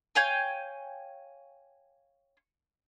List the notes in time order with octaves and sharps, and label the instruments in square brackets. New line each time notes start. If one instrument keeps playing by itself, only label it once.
[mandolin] C#5 F5 G5 G#5